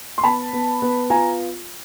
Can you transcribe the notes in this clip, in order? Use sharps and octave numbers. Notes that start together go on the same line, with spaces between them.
C6
B3 A5 B5
B3
B3
F4 G#5 A#5